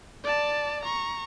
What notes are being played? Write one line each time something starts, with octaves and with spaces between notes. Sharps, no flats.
D5 A5
A#5 C#6